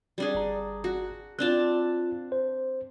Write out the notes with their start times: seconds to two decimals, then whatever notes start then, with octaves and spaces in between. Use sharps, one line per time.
0.18 G3 D4 G#4
0.35 G1 A#5
0.84 F#4
1.39 C4 D4 F4 A5 F#6
2.32 C5